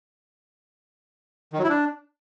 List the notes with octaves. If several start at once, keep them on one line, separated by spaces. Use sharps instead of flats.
D#3
F#3
E4
D4